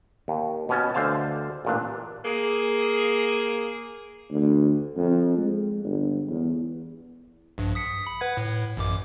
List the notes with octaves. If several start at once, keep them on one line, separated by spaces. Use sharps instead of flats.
D#2
B2 C#4 A5
D2 D3 C5 F5 A5
A1 A#2 D4
A#3 G#4
D2
F2
G#3
G1
E2
A#1 G2
D#6 B6 C#7
B5
B4 F#5 G#6
A2
A1 F#2 D6